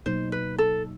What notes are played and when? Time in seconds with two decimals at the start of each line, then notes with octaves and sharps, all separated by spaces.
0.06 B2 F#3 A#3 D#4 C5
0.32 B4
0.58 A4